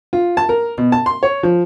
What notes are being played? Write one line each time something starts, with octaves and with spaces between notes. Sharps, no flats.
F4
A5
A#4
B2
A5
C6
C#5
F3